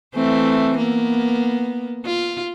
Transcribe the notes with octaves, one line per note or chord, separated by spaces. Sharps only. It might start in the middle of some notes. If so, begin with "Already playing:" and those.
E3 A3 C4
A#3 B3
F4